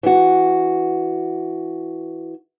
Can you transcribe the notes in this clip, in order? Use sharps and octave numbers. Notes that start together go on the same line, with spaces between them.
E3 F#4